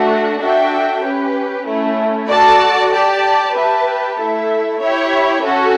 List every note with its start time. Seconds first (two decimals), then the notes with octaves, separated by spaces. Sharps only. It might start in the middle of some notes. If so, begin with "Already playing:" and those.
Already playing: A3 D4 F#4
0.39 D4 F#4 A4 E5 G5
1.03 C#4 G4 B4
1.65 A3 C#4 E4
2.29 F#4 A4 D5 A5
2.92 G4 D5 A5
3.56 G4 B4 E5 A5
4.18 A3 E4 A4 E5
4.81 E4 G4 C#5 E5
5.45 C#4 F#4 A4